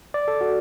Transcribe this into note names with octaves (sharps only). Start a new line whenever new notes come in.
D5
A4
F#4